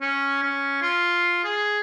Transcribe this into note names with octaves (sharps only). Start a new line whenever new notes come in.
C#4
C#4
F4
G#4